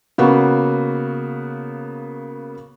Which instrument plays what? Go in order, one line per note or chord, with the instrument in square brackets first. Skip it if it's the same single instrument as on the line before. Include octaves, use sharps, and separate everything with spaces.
[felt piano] C#3 A#3 B3 F#4